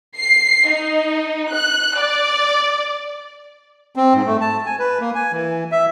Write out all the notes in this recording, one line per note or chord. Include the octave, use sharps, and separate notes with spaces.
C7
D#4
F#6
D5
C4
G#2
A3
A5
G#5
B4
A#3
G#5
E3
E5